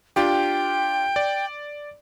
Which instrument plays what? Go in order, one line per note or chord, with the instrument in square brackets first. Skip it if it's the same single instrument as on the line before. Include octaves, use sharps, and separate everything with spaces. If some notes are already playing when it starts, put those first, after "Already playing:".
[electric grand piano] D4 F4 G4 [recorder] G5
[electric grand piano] D5